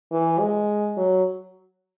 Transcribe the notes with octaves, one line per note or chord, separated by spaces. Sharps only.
E3
G#3
F#3